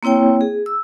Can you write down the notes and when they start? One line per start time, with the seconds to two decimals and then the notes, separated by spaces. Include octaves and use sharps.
0.03 A#3 C4 E4 C#5 G5
0.41 G#4
0.66 E6